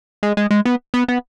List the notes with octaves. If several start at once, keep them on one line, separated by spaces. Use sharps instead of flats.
G#3
G#3
G#3
B3
B3
B3